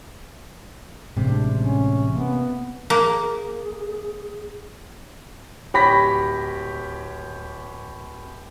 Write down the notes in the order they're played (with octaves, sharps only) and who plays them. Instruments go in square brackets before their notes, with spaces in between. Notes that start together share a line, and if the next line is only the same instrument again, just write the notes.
[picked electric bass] A1 G#3 [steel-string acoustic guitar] C3 [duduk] D4
[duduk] C#4
[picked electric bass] A#3 [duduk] B3
[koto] A#3 [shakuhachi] G#4
[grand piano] D1 G4 C#5 B5 A#6 B6